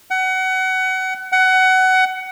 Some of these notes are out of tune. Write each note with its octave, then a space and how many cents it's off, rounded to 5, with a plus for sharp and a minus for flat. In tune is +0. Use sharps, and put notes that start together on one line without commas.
F#5 +25
F#5 +20